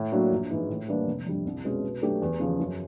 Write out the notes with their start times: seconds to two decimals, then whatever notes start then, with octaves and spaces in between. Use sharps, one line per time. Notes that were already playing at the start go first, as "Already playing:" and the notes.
Already playing: A2
0.12 F#3 A#3 D4 F#4
0.31 A#1
0.50 G#2 E3 G#3
0.69 A2
0.88 E3 G3 A#3 D4
1.07 F1
1.26 F2 D3 G3
1.45 C2
1.64 B2 G#3 C#4
1.83 B2
2.02 F#3 A3 D4 G4
2.21 E2
2.40 C#3 F3
2.59 F#2